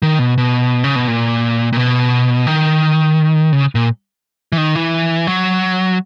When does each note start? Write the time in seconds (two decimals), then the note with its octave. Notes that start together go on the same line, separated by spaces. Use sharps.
0.02 D#3
0.19 B2
0.38 B2
0.84 C#3
0.96 B2
1.07 A#2
1.73 A#2
1.77 B2
2.47 D#3
3.53 C#3
3.75 A#2
4.52 E3
4.58 D#3
4.75 E3
5.27 F#3